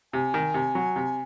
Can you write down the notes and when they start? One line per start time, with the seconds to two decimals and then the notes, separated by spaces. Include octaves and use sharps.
0.13 C3 G#5
0.34 D#3
0.54 C3
0.75 F#3
0.96 C3